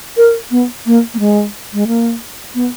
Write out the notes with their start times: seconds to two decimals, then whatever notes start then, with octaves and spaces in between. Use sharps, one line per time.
0.17 A#4
0.51 B3
0.86 A#3
1.14 A#3
1.19 G#3
1.73 G#3
1.87 A#3
2.55 B3